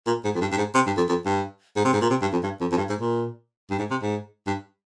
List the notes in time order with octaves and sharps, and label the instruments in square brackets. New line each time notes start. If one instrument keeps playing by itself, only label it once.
[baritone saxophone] A#2
G#2
F2
G2
G2
G#2
C3
G2
F2
F2
G2
G#2
C3
G#2
A#2
C3
G2
F2
G2
F2
F2
G2
G#2
A#2
G2
G#2
C3
G#2
G2